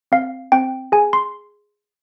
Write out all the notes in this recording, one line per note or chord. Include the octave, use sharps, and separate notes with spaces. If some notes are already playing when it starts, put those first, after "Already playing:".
C4 F5
C4 G5
G#4 G#5
C6